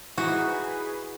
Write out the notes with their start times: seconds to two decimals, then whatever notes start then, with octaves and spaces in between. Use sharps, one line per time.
0.18 E3 D#4 F#4 G#4 B4